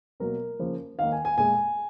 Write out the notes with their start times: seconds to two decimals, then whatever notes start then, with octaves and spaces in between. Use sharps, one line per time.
0.20 B2 F#3 A#3 A#4
0.59 C#3 F3 A#3
0.99 D#3 A#3 F5
1.12 G#5
1.25 G#5
1.38 A#2 G#3 G#5